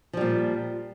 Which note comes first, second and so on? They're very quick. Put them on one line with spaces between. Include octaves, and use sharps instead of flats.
F3 G3 A#2